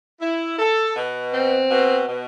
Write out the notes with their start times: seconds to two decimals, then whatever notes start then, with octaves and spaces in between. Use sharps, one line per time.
0.21 E4
0.59 A4
0.96 B2
1.33 C4
1.69 B2
2.07 B2